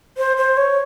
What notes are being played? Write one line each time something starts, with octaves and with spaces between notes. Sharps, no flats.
C5
C5
C#5